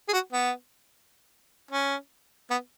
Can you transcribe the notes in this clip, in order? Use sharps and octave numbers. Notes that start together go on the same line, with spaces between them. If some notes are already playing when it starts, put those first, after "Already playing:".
G#4
F#4
B3
C#4
B3